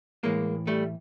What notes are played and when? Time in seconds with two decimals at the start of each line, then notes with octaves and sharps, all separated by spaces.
0.23 A2 E3 G#3 A#3
0.67 G3 A3